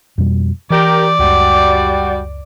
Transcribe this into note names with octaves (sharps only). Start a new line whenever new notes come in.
F2 B2 G3
E3 G4 A#4 D5
C#2 F#2 G3 F#4